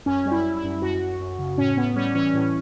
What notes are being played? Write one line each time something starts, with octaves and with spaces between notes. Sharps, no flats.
F#2 C#4
G3
E4
G3
E4
F#2
F#2 F#4
F#2
F#2
C#3
A2 C#4
A2 B3
G3 C#4
E3 C#4
A2